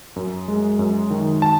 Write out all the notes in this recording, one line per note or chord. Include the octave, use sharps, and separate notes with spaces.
F#2
G#3
F#2
D#3
A5